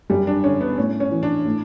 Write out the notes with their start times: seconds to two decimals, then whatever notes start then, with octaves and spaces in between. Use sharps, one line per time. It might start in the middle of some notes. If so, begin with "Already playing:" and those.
0.10 F#2 G3
0.27 D4
0.44 D3 C#4
0.61 B3
0.78 A2 C#4
1.00 C#4
1.11 E3
1.23 D4
1.45 A2